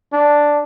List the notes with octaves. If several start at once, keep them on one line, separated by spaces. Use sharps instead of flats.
D4